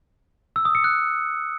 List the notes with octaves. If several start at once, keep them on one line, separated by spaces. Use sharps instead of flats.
E6
D#6
C#7
F#6